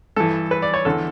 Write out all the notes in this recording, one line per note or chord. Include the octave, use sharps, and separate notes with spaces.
G2 E3 A4
B4
D5
C#5
E2 D3 A4